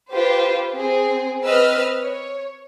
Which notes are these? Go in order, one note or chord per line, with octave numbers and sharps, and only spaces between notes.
F4 G4 B4 C5
C4 G#4
C4 B4 D#5 E6 F6
C#5